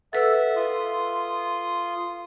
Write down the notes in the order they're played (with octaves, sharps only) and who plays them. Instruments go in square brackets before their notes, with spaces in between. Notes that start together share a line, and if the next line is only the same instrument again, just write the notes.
[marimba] A4 B4 E6 [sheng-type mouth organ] E5 F#5
[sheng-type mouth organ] F4 C6 D#6